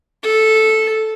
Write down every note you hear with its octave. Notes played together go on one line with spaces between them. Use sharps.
A4